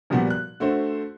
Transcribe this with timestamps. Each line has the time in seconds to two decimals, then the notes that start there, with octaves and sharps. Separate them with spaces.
0.10 A#2 F3 G3 B3 F#4
0.30 F#6
0.60 D3 A3 F#4 C5